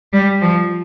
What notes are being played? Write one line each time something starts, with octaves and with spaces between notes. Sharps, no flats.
G3
F3